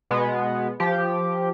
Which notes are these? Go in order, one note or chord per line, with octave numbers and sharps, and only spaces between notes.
B2 G#3 B3
F3 G4